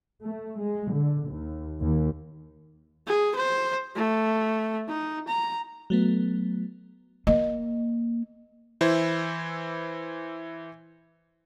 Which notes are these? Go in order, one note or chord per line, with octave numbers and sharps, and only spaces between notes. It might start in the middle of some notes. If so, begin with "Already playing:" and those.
A3
G#3
D3
D#2
D#2
G#4
C5
A3
D#4
A#5
F#3 A3 B3
A#3 D#5
E3 E4 C5